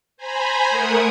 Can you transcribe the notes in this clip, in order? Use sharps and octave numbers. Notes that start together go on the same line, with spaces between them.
C5 G#5 A#5 B5
A3 A#4 F#5 D#6 G#6